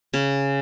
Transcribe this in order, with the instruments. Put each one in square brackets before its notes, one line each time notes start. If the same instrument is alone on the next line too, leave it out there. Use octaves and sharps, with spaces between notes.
[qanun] C#3